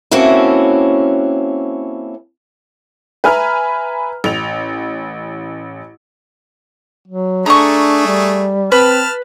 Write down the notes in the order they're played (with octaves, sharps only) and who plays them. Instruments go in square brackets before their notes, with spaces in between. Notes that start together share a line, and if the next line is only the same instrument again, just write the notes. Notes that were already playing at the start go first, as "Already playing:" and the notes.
[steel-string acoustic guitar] A#3 C4 C#4 E4 F#4 A4
[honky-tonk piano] B4 E5 G#5 A#5 F6
A1 F7
[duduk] F#3
[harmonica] A3 G#4 A4 [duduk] D4 [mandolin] A#5 C#6
[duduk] G3
[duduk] C4 [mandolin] B4 [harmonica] A5 F6